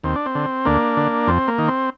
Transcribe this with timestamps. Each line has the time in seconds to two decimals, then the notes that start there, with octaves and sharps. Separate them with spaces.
0.04 D#2 C4
0.16 D4
0.26 C4
0.35 D3
0.65 D2 A#3 D4
0.97 D3
1.27 F2 C4
1.48 A#3
1.58 D#3
1.68 C4